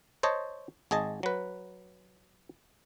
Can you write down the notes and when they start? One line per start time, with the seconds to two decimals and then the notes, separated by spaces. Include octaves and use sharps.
0.23 C5 C#5 D#5 A5
0.91 G#1 G#4 D#5 A5
1.23 F#3 B4